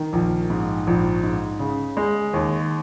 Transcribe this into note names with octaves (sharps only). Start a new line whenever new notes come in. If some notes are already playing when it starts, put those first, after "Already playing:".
Already playing: D#3
A#1
G#2
A#1
G#2
C#3
G#3
D#2